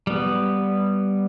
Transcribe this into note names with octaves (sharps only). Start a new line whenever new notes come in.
G3 B3